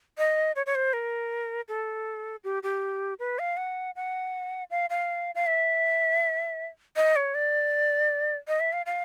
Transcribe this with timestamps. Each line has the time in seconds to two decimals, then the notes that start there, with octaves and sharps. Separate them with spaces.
0.18 D#5
0.56 C#5
0.66 C#5
0.75 C5
0.93 A#4
1.68 A4
2.44 G4
2.63 G4
3.19 B4
3.39 F5
3.57 F#5
3.96 F#5
4.71 F5
4.90 F5
5.35 F5
5.47 E5
6.96 D#5
7.16 C#5
7.35 D5
8.48 D#5
8.60 E5
8.73 F5
8.86 F5